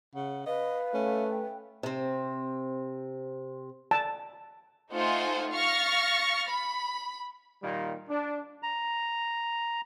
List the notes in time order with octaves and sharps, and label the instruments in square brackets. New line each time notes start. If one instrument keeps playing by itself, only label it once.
[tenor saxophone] C#3 [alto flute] F#5
[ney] B4 [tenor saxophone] D#5 [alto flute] F5
[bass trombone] A3 [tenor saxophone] C#4
[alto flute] G5
[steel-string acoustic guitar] C3 C4
[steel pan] A5
[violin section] A3 D#4 F4 C5 F#5 G#5
F5 C#6 F6 A6 A#6
B5
[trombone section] A#2 D#3 G3 A#3
D4
[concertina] A#5